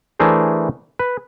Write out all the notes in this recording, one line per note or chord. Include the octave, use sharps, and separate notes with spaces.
E3 A3 D4 G#4 A#4 C5
B4